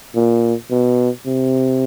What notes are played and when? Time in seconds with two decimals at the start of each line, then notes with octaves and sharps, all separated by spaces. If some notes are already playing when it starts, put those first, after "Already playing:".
0.15 A#2
0.71 B2
1.27 C3